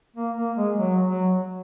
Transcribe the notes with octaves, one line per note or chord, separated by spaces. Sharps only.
A#3
A#3
G#3
F#3
F#3